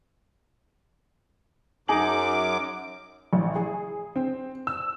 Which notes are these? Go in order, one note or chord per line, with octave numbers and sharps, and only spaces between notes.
F#2 D#4 G#4 D6 F#7
A1
G#4
C4
E6